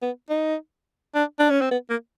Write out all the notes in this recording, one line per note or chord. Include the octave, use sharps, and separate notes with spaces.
B3
D#4
D4
D4
C#4
C4
B3
A#3